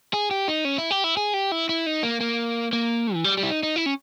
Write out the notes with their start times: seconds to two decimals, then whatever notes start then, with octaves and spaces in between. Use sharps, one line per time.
0.14 G#4
0.31 G4
0.48 D#4
0.65 C#4
0.78 E4
0.91 G4
1.04 E4
1.17 G#4
1.34 G4
1.52 E4
1.69 E4
1.86 D#4
2.03 A#3
2.21 A#3
2.73 A#3
3.14 E3
3.24 G3
3.37 G3
3.43 E4
3.50 D#4
3.63 D#4
3.76 E4
3.86 C#4